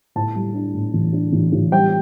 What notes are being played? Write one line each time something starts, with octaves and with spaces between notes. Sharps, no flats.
A2 A5
G3
D4
A2
A1
D4
A1
A1
G3 G5